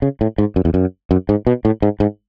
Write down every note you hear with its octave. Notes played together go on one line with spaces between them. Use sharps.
C#3
A2
G#2
F#2
E2
F#2
F#2
G#2
B2
A2
G#2
G#2